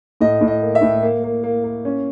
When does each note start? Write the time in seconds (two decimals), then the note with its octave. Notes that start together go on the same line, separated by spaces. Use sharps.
0.21 A2 D#5
0.41 A2
0.48 D#5
0.62 A#3
0.75 E5
0.82 A2
1.02 A#3
1.24 A#3
1.44 A#3
1.64 A#3
1.85 C#4